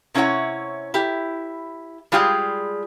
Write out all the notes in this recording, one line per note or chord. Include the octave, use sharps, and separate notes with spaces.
C3 C#4 E4 G#4 C#5 F#5
E4 G4
G3 G#3 F4 G4 G#4